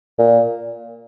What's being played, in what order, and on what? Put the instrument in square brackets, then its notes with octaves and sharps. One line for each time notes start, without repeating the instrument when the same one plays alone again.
[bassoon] A#2